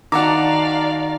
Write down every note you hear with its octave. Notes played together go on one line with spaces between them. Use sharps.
D#3 F#4 D5 F5 F#5 A5 A#5 D6